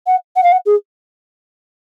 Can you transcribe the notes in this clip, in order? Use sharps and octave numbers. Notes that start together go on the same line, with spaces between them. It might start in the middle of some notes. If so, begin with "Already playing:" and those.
F#5
F#5
F5
F#5
G#4